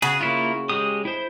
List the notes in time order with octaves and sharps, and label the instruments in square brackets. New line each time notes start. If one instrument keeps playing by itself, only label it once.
[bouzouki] C#3 F#4 [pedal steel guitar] G#4
[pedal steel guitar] A#3 E4 F4
G#3 G4 D#6
E4 C5